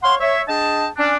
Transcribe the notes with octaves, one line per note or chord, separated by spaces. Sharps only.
C#5 F5 F#5 C6
C#5 E5
D4 G#4 D#5 G5 A5
C#4 D4